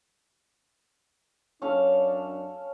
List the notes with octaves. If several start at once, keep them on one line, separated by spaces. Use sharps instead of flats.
F#2 C#4 D4 A4 F5